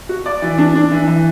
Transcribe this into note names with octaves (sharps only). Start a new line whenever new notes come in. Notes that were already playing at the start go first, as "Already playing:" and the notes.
F#4
D5
E3
D4
D4
E3
E3